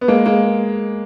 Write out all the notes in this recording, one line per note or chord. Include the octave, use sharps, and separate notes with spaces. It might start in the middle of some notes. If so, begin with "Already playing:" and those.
B3
G#3 A#3
G#3 A#3